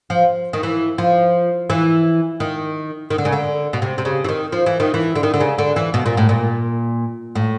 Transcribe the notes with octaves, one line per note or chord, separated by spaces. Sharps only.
F3
D#3
E3
F3
E3
D#3
D#3
D3
C#3
D3
B2
C3
C3
C#3
E3
D#3
F3
E3
D#3
E3
D3
D#3
D3
C#3
D3
E3
B2
A#2
A2
A#2
A2